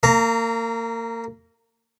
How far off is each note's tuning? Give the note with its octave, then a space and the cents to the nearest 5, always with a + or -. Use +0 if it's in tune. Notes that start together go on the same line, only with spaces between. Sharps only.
A#3 -30 A#5 +0